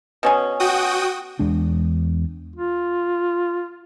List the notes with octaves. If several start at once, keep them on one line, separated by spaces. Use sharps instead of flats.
B2 C#4 G#4
F#4 G5 D#6
E2 G#3 D4
F4